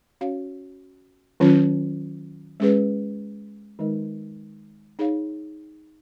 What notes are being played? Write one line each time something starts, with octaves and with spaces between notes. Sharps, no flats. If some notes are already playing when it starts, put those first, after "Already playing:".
C#4 F#4 C#5 F5
D#3 F#3 C#4 F4
G#3 C#4 G#4 B4
D#3 G#3 D#4 A#4 D#5
D#4 G#4 C#5 F5